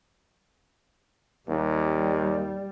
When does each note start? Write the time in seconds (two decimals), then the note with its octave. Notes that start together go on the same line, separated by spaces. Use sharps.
1.49 D#2 G3